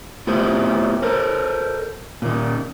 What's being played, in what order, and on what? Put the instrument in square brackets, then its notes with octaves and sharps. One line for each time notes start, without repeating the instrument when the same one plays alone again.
[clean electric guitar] A3 B3 E4 F4 G4 C5
A4 A#4 C5
A#2 D#3